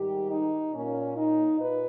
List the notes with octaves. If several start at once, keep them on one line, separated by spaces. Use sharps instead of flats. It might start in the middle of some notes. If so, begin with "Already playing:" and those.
Already playing: G#2 D#3 G3 G4
D#4
A#2 A#3 C#4
D#4
A#2 B4